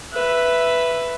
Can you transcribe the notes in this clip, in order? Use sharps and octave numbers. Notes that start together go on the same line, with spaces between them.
B4 E5